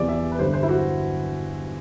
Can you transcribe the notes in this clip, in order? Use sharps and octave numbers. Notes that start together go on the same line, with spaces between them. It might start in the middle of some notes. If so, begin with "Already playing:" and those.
Already playing: E2 C3 E3 D5
E5
B4
G2 D3 C5
C5
E4
F#4